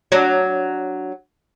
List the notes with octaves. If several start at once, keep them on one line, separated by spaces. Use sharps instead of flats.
F#3 D4